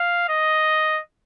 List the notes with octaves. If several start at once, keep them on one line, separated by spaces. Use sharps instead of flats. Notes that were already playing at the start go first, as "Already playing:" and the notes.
Already playing: F5
D#5